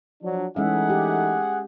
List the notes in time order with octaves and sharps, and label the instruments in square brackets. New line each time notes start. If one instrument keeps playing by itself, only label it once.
[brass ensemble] F3 F#3 D4
[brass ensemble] E3 A3 D#4 [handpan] G#3 C#4 E5 [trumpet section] G#4 F#5
[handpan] G4